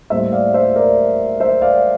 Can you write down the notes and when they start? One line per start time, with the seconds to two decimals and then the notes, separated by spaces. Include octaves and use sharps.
0.10 A2 G3 A#3 C5 E5
0.32 D5 F5
0.54 C5 E5
0.76 A#4 D5
1.40 C5 E5
1.62 D5 F5